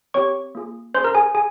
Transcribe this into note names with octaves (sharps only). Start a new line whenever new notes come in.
C4 G4 C#5 C#6
A#3 F4 G#4
C#4 G#4 C5 C6
A#4 A#5
G#4 G#5
G#4 G#5